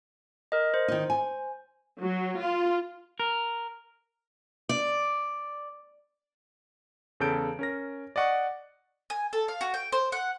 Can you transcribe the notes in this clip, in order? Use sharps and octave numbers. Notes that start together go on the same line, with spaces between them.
A#4 D#5
C5
D#3 D#4
G#5
F#3
F4
A#4
D5
E2 C#3 A4 G6 D7
C#4 A#4 A#6
D5 D#5 F#5 C#6
G#5
A4
F5
F#4
G5
C5
F#5